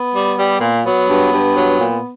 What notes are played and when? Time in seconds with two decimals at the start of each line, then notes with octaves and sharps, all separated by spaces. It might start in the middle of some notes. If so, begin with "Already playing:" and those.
Already playing: B3
0.13 G3
0.37 G3
0.60 A#2
0.84 F#3 B3
1.07 G2
1.31 G2
1.55 F#3
1.79 A#2